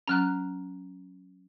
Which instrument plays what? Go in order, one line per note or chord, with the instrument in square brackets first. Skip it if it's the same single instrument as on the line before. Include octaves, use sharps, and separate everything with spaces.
[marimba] F#3 C#4 [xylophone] A#5 F6 F#6